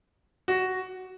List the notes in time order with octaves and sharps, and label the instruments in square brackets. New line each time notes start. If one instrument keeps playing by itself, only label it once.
[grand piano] F#4